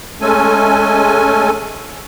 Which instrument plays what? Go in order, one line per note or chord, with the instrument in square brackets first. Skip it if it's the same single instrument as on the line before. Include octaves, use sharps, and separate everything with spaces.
[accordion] G#3 A3 C#4 A4 G#5